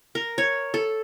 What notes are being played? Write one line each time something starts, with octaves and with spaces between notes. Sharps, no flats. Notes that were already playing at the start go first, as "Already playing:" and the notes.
A#4
C#5
A4